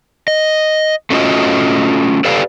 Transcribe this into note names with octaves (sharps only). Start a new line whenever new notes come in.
D#5
A3 C#4 D4 F4 F#4 D#5
G4 A4 B4 D5 F5